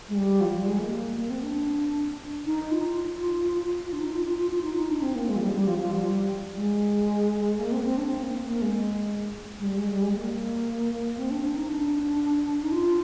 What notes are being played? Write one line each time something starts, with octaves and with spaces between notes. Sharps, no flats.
G#3
G3
F3
G3
G#3
A#3
A#3
C4
D4
D#4
F4
D4
D#4
F4
F4
F4
F4
D#4
D#4
D4
C4
A#3
G#3
F3
G3
G3
F3
F3
G3
G#3
A#3
C4
C4
D4
C4
A#3
A#3
G#3
G#3
G3
G#3
G3
G#3
A#3
C4
D4
D4
D#4
D4
D#4
F4